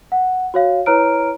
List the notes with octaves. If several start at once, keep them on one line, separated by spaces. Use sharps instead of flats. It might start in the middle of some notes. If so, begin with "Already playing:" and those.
F#5
F#4 C#5 F5
E4 B4 C#5 A#5 F6 D7